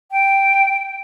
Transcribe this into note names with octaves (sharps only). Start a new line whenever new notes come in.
G5